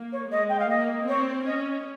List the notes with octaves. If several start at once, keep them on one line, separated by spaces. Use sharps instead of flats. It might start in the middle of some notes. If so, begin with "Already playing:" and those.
Already playing: A#3
C#5
G#3 D#5
G5
F5
A#3 D#5
C4 C#5
C#4 D#5